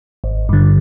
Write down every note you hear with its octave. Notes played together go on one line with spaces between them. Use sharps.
G#1
G2 D3